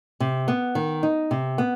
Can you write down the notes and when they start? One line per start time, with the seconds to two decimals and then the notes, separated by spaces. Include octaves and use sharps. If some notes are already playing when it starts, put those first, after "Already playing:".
0.20 C3
0.48 B3
0.75 D#3
1.03 D#4
1.31 C3
1.58 B3